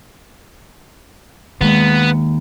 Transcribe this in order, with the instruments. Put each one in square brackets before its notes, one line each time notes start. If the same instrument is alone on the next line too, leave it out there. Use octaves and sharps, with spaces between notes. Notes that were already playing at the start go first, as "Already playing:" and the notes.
[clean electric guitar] D#2 [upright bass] G#3 [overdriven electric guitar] B3